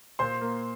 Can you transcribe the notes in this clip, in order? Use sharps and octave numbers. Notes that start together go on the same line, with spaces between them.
A#2 C5 C6
A#3